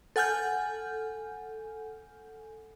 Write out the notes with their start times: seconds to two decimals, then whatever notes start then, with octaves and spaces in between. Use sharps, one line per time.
0.16 A4 F#5 G#5 F6 G6